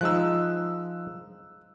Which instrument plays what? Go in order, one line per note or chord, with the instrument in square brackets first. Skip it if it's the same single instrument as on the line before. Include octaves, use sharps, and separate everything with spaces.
[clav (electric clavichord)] F3 G#3 D#4 [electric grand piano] E6 F#6